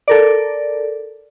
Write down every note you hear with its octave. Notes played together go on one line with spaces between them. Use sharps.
A4 A#4 D5